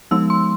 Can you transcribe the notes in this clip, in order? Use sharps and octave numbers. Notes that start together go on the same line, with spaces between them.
F3 G#3 B3 D#4 E6
C6